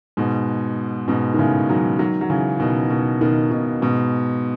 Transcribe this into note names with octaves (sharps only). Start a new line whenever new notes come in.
G#2 B2
G#2 B2
D#3
A2 C#3
D#3 F#3
D#3 F#3
F#3
C#3 E3
B2 D#3
B2 D#3
B2 D#3
B2 D#3
G#2 B2